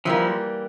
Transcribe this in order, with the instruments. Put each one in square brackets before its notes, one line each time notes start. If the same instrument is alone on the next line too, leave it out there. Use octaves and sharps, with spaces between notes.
[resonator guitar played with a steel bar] E3 G3 A#3 [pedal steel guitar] F3